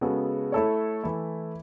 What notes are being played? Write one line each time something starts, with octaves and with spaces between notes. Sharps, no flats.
C#3 G#3 B3 F#4 A4
A3 E4 A4 C#5
E3 A3 E4